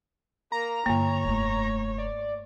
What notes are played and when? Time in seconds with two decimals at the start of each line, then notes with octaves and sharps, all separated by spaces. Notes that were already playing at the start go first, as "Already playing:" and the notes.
0.52 A#3 A#5
0.86 G2 D3 F#3 A#3 C#5
1.24 F1 A3
1.98 D5